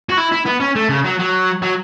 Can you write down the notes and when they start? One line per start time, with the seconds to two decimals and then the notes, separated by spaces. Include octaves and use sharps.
0.09 F#4
0.18 E4
0.32 E4
0.46 B3
0.61 C#4
0.76 A3
0.89 C#3
1.05 F#3
1.19 F#3
1.62 F#3